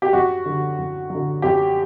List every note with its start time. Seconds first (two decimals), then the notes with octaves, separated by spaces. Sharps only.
0.02 G4
0.13 F#2 F#4
0.46 D3 F#3
0.78 F#2
1.10 D3 F#3
1.42 F#2 G4